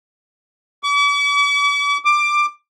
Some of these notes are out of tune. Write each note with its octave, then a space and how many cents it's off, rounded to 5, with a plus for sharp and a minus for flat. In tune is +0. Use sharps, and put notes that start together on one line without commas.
D6 -45
D6 +15